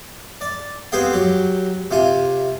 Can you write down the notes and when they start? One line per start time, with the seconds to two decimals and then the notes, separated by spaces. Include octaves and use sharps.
0.41 D5
0.92 B3 C4 G4 G#4 F5 G5
1.13 F#3 G4
1.91 C3 F4 G#5